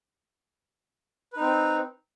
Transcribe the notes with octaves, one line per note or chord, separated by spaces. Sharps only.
C4 D#4 B4